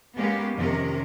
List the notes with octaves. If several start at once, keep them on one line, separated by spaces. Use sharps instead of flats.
G#3 A#3 B3 C#4 G4
F2 C3 D#3 C#4 A#4